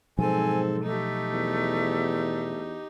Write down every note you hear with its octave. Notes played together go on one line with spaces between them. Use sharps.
G#2 B2 F3 F#3 C4 A4 G#5
A3 D#4 G4
E2